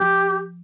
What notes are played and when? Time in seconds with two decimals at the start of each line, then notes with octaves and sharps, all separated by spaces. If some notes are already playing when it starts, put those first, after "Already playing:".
Already playing: F3 G4